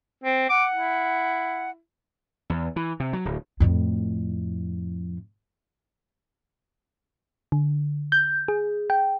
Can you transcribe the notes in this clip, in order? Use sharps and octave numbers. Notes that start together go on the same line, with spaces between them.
C4
F#5 D6
E4
E2
E3
C3
F#3
D1
F2 A2
D3
G6
G#4
G5